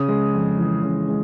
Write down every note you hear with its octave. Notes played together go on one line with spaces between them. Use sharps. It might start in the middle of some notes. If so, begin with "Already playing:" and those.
Already playing: C#3 D#6
G#3
F2
E3
C#3
G#3